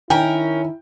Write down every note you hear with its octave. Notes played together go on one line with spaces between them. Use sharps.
D#3 C#4 E4 A#4 G5